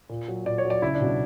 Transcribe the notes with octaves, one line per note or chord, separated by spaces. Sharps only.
A#2
F#3
A#2 D5
C#5
F#3
D5
C#2 E4
D4
B2 F#3
D4